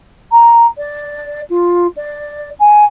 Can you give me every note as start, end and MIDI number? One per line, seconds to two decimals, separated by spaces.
0.31 0.66 82
0.77 1.41 74
1.50 1.87 65
1.96 2.50 74
2.59 2.84 80